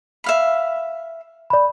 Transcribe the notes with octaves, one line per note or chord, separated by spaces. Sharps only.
E5 F5 B5
D5 B5